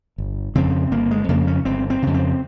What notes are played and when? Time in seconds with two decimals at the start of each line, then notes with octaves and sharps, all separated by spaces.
0.18 G1
0.55 F2 C#3 C4
0.91 G1 A#3
1.11 G#3
1.29 F2 C#3 A#3
1.47 C#4
1.65 G1 C4
1.90 C4
2.02 F2 C#3
2.14 C4